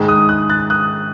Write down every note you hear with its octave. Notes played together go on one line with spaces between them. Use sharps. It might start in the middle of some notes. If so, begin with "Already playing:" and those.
Already playing: G#2 D#3 G#3
D#6 F#6
D#6 F#6
F#6 A6
D#6 F#6